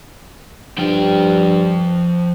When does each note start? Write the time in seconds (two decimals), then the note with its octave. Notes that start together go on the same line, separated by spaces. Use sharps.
0.78 G2 F3 G5